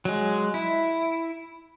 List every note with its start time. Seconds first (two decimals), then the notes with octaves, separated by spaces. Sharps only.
0.05 F#3 G#3
0.54 E4